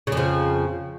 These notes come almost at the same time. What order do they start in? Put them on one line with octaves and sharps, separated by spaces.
C#3 F2 F3